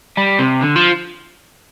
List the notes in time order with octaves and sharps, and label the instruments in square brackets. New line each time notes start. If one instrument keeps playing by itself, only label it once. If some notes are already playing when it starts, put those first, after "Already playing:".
[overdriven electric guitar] G3
C3
D3
F3